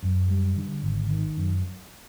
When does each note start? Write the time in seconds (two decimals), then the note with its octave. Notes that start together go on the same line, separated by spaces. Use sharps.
0.03 F#2
0.29 G3
0.57 D3
0.83 G#1
1.10 D#3
1.37 F#2